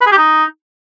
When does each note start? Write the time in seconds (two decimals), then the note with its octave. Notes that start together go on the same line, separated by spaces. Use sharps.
0.01 B4
0.06 G#4
0.12 G4
0.17 D#4